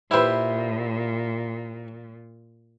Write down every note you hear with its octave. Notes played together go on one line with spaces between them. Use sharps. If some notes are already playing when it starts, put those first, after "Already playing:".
A#2 E4 G4 B4 C5 E5